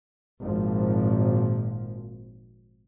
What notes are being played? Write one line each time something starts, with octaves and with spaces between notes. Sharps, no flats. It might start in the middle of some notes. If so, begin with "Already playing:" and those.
G#1 A#2 F3